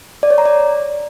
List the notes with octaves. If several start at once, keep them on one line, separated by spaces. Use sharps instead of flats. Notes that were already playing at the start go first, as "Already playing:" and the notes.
D5
C#5
A#5
D5